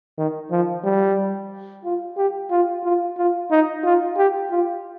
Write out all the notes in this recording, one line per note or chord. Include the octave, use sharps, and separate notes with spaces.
D#3
F3
G3
F4
G4
F4
F4
F4
D#4
F4
G4
F4